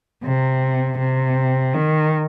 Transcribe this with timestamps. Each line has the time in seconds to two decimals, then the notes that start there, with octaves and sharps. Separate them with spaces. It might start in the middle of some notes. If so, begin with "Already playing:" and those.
0.24 C3
0.99 C3
1.74 D#3